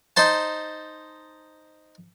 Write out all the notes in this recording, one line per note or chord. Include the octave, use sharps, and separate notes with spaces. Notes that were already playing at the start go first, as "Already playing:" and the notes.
D#4 C5 A5